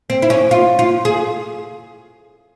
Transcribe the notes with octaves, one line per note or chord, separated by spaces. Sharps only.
C4
E4
C#4
F4
F4
G#4